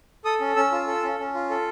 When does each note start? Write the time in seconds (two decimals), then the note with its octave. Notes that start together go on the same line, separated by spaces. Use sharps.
0.25 A4 D#6
0.40 C#4
0.56 C#4 E6
0.71 F4
0.87 A4
1.03 C#4
1.19 C#4
1.34 F4
1.50 A4